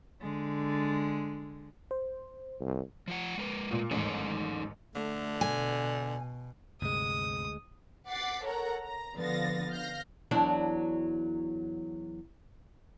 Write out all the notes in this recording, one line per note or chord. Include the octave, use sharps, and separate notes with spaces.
D3 G#3
C5
C2
F3 F4 F#5
G#3 A#4 B4
A#2 F4
A1 D#2 G#2 D#4 A4 C#5
D3 A3
B2 G#5
D2 G2 C3 G#3 D#6
F#5 D6 A6 B6 C7
A4 A#4 C#5 F#5 A#5
A#5
D3 F3 B3 F5 A6 A#6
F5 F6 G6 A#6
E2 F#3 D4